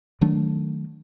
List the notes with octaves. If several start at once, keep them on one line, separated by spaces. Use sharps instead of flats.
D#3 F#3 A3 D4